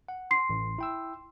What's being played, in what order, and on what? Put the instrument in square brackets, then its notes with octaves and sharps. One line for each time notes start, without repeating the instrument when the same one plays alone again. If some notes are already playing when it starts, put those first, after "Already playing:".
[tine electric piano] F#5
[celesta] C6 C7
[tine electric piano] A1
E4 G5 E6